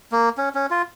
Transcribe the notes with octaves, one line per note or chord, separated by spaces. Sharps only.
A#3
C#4
C#4
F4